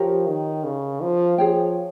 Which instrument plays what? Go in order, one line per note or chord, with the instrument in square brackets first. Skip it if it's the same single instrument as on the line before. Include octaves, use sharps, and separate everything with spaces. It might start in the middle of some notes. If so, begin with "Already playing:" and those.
Already playing: [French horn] F3 [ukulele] G4 A#4 C#5
[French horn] D#3
C#3
F3
[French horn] F3 [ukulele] G#4 C#5 G5